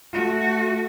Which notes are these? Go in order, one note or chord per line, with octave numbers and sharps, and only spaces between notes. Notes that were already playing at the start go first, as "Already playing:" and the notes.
A3 F#4